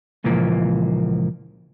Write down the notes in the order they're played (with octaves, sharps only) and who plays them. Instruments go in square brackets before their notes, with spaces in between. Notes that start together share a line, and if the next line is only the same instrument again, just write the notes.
[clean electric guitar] C#2 A#2 E3 F3 A#3